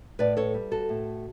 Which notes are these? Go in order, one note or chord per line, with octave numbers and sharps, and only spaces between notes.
A2 B4 D5
A4 C#5
G3
F#4 A4
A2